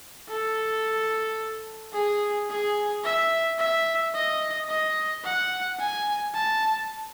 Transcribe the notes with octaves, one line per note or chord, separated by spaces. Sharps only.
A4
G#4
G#4
E5
E5
D#5
D#5
F#5
G#5
A5